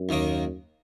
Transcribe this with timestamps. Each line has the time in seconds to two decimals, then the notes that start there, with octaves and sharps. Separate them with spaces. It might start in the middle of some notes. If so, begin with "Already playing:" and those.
Already playing: F#2
0.09 D#2 D#3 A#3